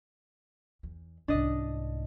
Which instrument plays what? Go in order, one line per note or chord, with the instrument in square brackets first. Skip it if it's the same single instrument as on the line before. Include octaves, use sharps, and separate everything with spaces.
[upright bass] E2
[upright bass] C2 G#2 [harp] D4 D#5